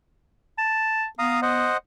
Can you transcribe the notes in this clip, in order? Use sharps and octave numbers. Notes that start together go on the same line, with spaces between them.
A5
B3 F5 A#5 D#6
C5 D#5 F#5